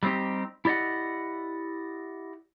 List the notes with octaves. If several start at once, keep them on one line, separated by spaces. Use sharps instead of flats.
G3 A3 C4 D#4 G4
E4 G4 D5 D#5 F#5